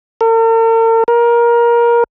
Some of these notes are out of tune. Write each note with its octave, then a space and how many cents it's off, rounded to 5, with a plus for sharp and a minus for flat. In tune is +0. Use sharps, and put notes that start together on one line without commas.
A#4 -45
A#4 +20